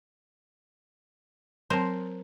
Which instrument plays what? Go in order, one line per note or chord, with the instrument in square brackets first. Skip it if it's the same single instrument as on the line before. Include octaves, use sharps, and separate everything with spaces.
[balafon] F#3 C4 A5 [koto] A#4 C5